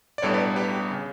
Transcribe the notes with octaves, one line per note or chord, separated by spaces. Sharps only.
D5
B1 A2 G3 B3 D4 A4 C#5
B4 D5
G4 B4
C#3